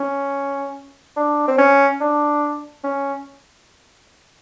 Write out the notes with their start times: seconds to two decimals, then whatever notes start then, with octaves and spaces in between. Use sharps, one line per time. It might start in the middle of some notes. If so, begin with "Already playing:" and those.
Already playing: C#4
1.17 D4
1.48 C4
1.58 C#4
2.01 D4
2.84 C#4